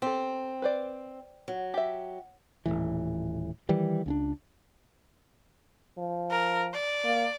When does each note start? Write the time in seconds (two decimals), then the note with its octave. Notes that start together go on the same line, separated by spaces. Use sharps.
0.02 C4 G4 A4
0.62 B4 C5 D5
1.48 F#3
1.74 G4 E5
2.66 D#1 G#1 A2 E3
3.69 D#3 E3 G3
4.06 C#2 C#4 D4
5.98 F3
6.31 A#4
6.74 D5
7.05 A#3